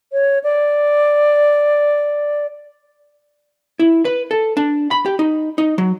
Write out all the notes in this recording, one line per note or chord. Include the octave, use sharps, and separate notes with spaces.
C#5
D5
E4
B4
A4
D4
B5
G4
D#4
D#4
F#3